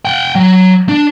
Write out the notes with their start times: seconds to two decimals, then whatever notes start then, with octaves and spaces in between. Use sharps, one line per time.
0.05 F#5 G5
0.35 F#3
0.89 D4